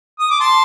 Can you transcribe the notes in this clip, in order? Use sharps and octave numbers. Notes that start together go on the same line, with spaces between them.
D#6
D6
A5 C6